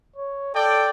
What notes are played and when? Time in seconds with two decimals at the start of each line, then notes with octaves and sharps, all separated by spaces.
0.16 C#5
0.54 A4 D5 G5